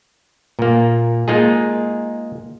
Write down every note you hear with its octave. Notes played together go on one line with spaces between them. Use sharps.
A#2 A#3
G#3 A#3 D#4 F4 G#4